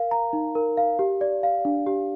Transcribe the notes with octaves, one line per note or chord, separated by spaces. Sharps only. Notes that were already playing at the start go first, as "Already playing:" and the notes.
Already playing: A#4 F5
A#5
D#4
A#4
F5
G4
D5
F5
D4
G4